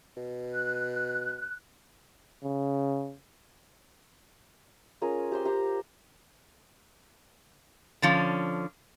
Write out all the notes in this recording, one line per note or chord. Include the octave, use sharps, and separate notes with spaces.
B2
F#6
C#3
C#4 F4 G#4 A#4
G4 C5 C6
G4 C5 A#5
D3 F3 C#4